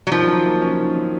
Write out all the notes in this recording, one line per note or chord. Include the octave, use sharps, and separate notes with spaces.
F#3
D#3 F3
F#3
A#3
C#4
D#3
F#3